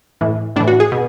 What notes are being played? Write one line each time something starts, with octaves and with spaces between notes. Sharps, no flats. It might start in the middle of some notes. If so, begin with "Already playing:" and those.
A2 E3
A2 E3 D4
F#4
G#4
B2